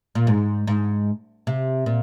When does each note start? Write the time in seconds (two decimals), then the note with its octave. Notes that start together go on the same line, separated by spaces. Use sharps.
0.15 A#2
0.27 G#2
0.67 G#2
1.47 C3
1.86 A#2